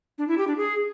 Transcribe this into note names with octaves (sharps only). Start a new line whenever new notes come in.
D4
E4
G4
D4
G#4